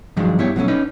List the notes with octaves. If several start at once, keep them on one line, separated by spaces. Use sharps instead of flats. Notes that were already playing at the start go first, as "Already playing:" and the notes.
G2 D#3 F3 F#3 G#3 D4
G2 B3 E4 G4 C#5
B2 F3 F#3 A3 C4 C#4
C#4 D#4 B4